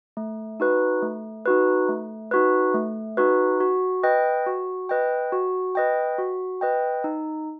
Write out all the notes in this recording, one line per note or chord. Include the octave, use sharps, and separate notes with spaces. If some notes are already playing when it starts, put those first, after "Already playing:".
A3
D#4 F#4 B4
A3
D#4 F#4 B4
A3
D#4 F#4 B4
A3
D#4 F#4 B4
F#4
B4 D#5 G5
F#4
B4 D#5 G5
F#4
B4 D#5 G5
F#4
B4 D#5 G5
D#4